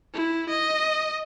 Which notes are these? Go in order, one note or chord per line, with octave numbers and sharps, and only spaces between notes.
E4
D#5